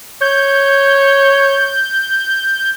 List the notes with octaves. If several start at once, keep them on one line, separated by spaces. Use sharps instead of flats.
C#5 G6